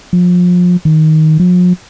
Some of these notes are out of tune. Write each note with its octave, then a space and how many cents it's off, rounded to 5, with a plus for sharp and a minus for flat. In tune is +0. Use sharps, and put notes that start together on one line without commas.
F3 +30
D#3 +10
F3 +45